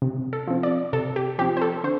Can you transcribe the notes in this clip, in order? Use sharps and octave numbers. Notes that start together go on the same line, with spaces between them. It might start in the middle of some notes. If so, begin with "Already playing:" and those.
C3
A4
F3 C4
D5
C3 A4
G4
F3 C4 G4
C5
A4
D3 C5